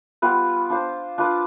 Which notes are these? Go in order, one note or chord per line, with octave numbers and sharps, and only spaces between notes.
G3 B3 F4 B4
D4 F4 C5
D4 F4 B4